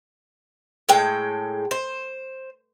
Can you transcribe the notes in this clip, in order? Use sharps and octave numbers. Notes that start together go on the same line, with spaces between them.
A2 G#3 G5
C5